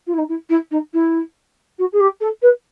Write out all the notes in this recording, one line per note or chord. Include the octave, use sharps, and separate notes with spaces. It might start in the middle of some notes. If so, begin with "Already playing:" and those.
F4
E4
D#4
E4
E4
D#4
E4
F#4
G#4
G4
A4
B4